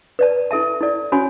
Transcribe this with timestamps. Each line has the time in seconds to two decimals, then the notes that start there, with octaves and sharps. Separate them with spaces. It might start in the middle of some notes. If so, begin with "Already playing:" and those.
0.19 B4 D5 A5
0.51 E4 A4 E5 A5
0.81 E4 A4 D5
1.12 C#4 F#4 C#5 G#5 B5